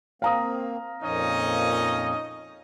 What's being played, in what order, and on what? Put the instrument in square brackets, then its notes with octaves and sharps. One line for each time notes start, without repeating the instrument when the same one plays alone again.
[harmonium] A#3 C4 [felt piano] F5 A#5 D#6
[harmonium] F2 A#2 F3 [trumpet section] C#4 D#4 D#5